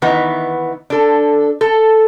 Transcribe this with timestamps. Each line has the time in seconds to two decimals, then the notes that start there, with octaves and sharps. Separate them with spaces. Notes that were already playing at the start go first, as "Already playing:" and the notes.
0.02 D#3 E3 B3 D#4
0.90 D4 A4
1.61 A4